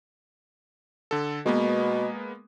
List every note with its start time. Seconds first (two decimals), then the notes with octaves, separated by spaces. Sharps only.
1.11 D3 A4
1.46 B2 G#3 A#3 B3